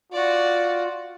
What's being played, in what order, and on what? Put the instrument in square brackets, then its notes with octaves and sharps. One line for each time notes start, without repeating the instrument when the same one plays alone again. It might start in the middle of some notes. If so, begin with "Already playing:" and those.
[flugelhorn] F4 [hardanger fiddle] F#4 D5